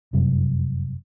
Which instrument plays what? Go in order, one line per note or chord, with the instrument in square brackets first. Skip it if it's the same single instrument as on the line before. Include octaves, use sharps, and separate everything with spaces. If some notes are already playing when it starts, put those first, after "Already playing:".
[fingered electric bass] F1 F#2 C3 G3